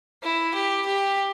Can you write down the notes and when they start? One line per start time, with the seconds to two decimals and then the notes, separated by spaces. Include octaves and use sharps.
0.23 E4
0.54 G4
0.86 G4